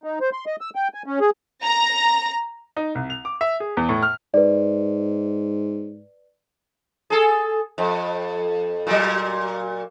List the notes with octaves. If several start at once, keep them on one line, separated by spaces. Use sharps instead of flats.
D#4
C5
C6
D#5
E6
G5
G#5
C#4
G#4
A#5 A#6
D#4
C2
F7
D6
E5
G#4
E2
A2
F6
G#2 B4 D5
G#4 A4
F2
A#2 F#3